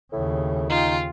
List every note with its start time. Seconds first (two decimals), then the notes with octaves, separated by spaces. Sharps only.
0.13 D#2 A2 C#3
0.69 D#4 F4 G5